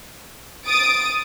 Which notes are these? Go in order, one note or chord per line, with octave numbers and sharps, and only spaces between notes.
D#6 A6 D7